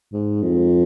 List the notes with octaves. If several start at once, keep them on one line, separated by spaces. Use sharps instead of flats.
G#2
F2